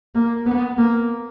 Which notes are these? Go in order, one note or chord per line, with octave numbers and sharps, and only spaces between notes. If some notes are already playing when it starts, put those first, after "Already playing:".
A#3
B3
A#3